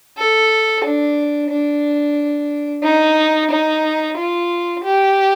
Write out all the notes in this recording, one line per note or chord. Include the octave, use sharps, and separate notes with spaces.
A4
D4
D4
D#4
D#4
F4
G4